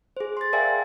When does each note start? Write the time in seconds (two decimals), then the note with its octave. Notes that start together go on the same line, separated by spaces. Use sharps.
0.17 G#4 C5
0.37 C6 A6
0.53 A#4 D5 E5 F5 G5 G#5